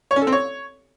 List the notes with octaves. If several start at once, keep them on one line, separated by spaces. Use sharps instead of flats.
C#5
C#4
A4
C4
C#5